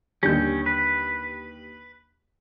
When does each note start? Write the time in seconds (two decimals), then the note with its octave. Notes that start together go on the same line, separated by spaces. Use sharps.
0.23 D#2 D3 G3 C#4 G6
0.66 B4